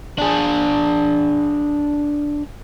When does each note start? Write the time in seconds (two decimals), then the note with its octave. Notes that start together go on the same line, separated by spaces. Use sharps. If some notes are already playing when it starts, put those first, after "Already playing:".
0.18 D4 G#4